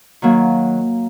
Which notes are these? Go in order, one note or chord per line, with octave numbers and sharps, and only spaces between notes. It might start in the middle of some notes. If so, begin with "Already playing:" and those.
D#3 F#3 A#3